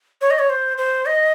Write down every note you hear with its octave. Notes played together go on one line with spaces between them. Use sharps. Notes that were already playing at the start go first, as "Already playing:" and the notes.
C#5
D#5
C#5
C5
C5
D#5